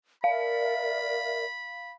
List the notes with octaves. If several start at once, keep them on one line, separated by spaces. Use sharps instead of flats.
A#4 D5 E5 F5 B5